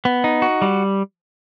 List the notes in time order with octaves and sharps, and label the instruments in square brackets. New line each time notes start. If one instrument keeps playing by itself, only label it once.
[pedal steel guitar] B3
D#4
F#4
G3